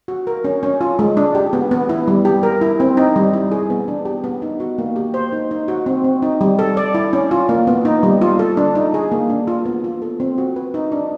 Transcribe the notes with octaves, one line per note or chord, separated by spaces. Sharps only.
F#4
A#4
C#4
C#4
F4
G#3
D4
G4
B3
B3
E4
G3
G4
A#4
E4
C4
D#4
G3
E4
G#4
B3
D4
G4
B3
D#4
F#4
A#3
G4
C5
D#4
D#4
F#4
C4
C4
D#4
G3
A4
D5
E4
C#4
F4
A#3
B3
D#4
G3
F4
A4
D4
D#4
G#4
A#3
D4
F4
B3
F4
A4
C4
F#4
B4
D#4
D4